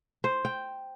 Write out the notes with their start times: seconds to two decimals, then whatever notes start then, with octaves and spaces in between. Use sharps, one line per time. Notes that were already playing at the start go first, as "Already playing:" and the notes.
0.24 C5
0.45 G5